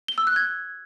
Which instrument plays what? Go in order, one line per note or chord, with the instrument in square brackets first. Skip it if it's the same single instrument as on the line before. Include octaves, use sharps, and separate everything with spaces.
[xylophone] G7
E6
F#6
G#6